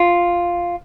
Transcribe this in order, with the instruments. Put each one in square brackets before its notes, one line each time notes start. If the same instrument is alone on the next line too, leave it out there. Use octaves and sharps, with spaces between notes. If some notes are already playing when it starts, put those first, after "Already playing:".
Already playing: [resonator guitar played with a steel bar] F4